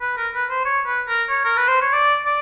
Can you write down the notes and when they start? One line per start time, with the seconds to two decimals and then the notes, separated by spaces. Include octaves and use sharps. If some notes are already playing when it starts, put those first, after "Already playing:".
0.01 B4
0.17 A#4
0.34 B4
0.50 C5
0.65 C#5
0.86 B4
1.08 A#4
1.29 C#5
1.45 A#4
1.57 B4
1.68 C5
1.82 C#5
1.93 D5
2.26 D5